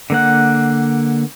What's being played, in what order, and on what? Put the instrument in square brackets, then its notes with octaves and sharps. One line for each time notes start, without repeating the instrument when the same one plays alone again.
[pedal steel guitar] D3 A#3 F#5